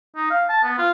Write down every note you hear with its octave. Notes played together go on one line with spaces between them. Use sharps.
D#4
F5
A5
B3
F4